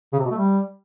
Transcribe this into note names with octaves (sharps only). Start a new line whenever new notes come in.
C#3
C3
B2
A3
G3